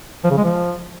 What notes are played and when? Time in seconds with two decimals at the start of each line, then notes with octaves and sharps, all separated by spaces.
0.24 F3
0.31 C#3
0.38 G#3
0.44 F3